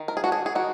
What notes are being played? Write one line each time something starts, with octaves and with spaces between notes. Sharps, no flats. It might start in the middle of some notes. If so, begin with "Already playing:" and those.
Already playing: D#3
A#4
G#4
D4 F#4
G#4
G#4
D#3 F#4